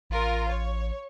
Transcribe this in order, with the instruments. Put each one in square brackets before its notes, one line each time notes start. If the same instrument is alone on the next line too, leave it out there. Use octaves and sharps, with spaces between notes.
[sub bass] A1 [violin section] F4 A#4
[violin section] C#5